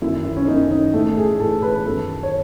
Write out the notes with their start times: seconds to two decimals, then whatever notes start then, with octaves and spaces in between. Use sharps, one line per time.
0.02 F#2 D#3 E4
0.25 E4
0.37 C#4
0.47 F#2 D#3 D#4
0.71 D#4
0.94 A2 E3 A3
1.09 A4
1.17 G#4
1.39 A2 E3 A4
1.62 B4
1.86 F#2 D#3 A4
2.23 C#5